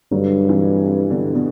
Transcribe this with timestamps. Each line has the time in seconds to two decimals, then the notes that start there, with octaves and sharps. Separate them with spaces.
0.12 G2 D3 F#3
0.49 C3 E3
0.86 C3
1.10 B2 D3
1.35 B2 D3